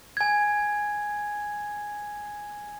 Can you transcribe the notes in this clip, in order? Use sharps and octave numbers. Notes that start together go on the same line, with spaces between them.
G#5 G#6